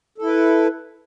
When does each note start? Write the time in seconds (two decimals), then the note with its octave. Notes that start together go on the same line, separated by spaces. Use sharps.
0.18 A4
0.22 E4
0.26 B4